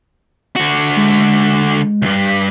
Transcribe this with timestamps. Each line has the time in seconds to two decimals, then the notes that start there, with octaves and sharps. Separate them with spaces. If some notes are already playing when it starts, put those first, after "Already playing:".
0.56 D3 F#4
0.97 G#3
2.02 C#2 G2
2.18 B6